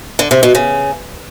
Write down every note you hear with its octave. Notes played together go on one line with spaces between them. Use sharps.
D3
C3
B2
C#3